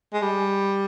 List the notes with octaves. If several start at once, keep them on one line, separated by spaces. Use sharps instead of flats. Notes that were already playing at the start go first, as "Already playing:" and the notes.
G#3
G3